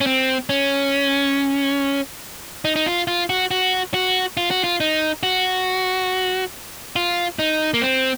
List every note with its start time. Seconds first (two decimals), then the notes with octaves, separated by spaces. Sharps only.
0.01 C#4
0.06 C4
0.49 C#4
2.65 D#4
2.76 D#4
2.86 F4
3.08 F4
3.30 F#4
3.51 F#4
3.94 F#4
4.37 F4
4.51 F#4
4.64 F4
4.80 D#4
5.23 F#4
6.96 F4
7.39 D#4
7.74 A#3
7.82 C4